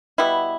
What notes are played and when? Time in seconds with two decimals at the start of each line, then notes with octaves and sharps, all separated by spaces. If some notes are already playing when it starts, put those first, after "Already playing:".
0.18 B2 G3 B3 E4